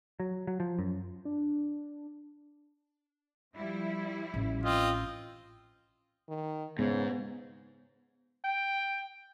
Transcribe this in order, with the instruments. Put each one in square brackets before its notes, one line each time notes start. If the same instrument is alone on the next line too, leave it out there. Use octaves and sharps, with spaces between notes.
[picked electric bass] F#3
F#3
F3
F#2
[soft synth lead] D4
[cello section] F3 G3 E4
[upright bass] A1
[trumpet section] C4 F4 D#5
[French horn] D#3
[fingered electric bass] G#2 [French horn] C#3 [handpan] B3
[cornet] G5